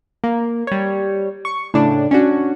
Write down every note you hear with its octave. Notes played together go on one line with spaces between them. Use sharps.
A#3
G3 C#5
C#6
A2 C#3 D4
C#4 D4 F#4